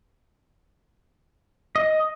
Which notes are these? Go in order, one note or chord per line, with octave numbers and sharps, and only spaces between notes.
D#5